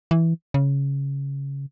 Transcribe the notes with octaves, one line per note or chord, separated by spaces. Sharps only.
E3
C#3